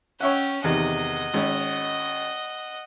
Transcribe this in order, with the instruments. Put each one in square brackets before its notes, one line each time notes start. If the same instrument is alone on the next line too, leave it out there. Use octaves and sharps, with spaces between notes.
[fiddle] C#4 G5 [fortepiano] C#5 E5 F#5
[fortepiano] E2 C3 D#3 [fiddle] D#5 F#5
[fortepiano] G#1 C#4